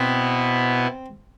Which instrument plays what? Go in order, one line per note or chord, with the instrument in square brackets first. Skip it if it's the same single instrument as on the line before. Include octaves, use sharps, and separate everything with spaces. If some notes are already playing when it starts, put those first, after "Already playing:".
Already playing: [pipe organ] B2 B3 E4 [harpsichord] C4